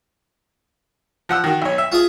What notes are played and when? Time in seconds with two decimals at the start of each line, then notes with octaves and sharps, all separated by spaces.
1.29 F3 F#5 E6
1.44 D#3 F#4
1.62 B1 C#5
1.78 E5
1.92 F4 G#4